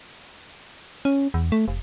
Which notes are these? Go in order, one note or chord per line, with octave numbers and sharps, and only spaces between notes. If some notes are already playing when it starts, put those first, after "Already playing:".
C#4
E2
A3
F1